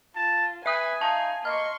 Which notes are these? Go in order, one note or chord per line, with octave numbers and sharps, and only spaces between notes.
F4 A5
B4 E5 G#5 D#6
D#4 F5 A5
A#3 D#5 C6 C#6 F6